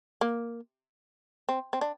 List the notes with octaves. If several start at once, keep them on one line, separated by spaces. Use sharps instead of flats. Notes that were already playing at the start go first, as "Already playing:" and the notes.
A#3
C4
C4
D4